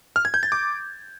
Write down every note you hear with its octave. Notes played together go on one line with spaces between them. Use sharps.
F6
G#6
G6
A6
D6